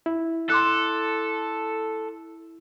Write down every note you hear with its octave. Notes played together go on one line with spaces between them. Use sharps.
E4
A4 C6 D6 F#6